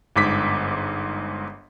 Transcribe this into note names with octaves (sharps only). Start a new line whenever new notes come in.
G1 G#2 D6 B6